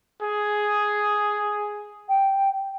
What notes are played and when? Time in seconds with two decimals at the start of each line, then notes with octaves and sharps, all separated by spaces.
0.22 G#4
2.09 G5